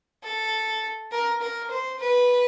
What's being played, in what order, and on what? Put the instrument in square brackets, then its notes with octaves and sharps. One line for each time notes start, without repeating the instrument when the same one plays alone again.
[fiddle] A4
A#4
A#4
C5
B4